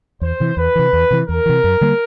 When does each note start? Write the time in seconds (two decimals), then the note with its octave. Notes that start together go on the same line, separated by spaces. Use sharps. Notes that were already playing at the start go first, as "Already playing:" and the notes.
0.21 E2 C5
0.40 C3 E3
0.57 E2 B4
0.75 C3 E3
0.93 E2
1.11 C3 E3
1.28 E2 A#4
1.46 C3 E3
1.64 F#2
1.81 D3 G3 A#3